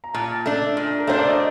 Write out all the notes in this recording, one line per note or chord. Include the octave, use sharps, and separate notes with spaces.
A#5
A#2 A5
A3 D4
A#2
A#4
A3 D4 C5
D5
D#5